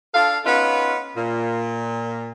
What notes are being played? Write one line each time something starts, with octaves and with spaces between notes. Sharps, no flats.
D4 A4 F5
B3 C#4 D#4 F4 B4
A#2